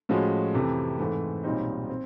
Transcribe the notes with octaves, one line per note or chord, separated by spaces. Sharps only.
A2 F3 G#3 C#4 F#4
F2 C3 E3 A3
G#2 E3 A3 C4
B1 A#2 G3 C4 D#4
C4